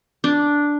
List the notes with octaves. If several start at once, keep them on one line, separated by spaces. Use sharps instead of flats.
D4